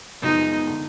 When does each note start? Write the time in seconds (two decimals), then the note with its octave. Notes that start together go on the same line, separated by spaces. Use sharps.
0.22 F#2 C#3 F3 G#3 B3 D#4
0.67 D3